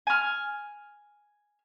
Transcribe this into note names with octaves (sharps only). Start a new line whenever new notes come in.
G#5 F6